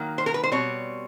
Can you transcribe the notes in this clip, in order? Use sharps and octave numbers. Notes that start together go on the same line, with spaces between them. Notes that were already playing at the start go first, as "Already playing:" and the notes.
Already playing: D#3 F#3 A#3
C5
A#4
B4
C5
B2 G3 C4 C#5